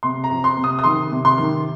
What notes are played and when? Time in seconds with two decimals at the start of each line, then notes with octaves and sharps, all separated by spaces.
0.03 C3 C6
0.24 A#5
0.30 F2
0.44 C6
0.57 C3
0.64 D#6
0.79 D#6
0.84 D#3 C6
1.11 C3
1.25 C6
1.38 D#3